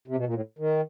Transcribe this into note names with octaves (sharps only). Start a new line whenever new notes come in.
C3
B2
A#2
A2
D#3